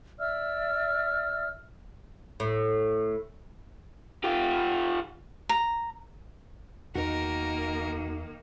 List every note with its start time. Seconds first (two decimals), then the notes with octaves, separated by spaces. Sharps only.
0.19 D5 E5 E6 F6
2.40 A2
4.24 F4 G4
5.49 A#5
6.95 E2 D#3 A#3 D#4 F#4 A#4